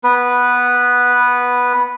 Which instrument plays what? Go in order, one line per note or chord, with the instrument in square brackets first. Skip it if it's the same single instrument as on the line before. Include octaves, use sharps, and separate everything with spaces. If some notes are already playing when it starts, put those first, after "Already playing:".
[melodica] B3 B4